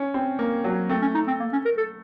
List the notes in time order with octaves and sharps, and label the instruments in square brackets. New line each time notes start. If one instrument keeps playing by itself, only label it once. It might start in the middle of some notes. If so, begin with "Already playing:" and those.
Already playing: [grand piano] C#4
C4
A#3
F#3
[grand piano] A3 [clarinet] C4
[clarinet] C#4
D#4
C4
A#3
C#4
A#4
A4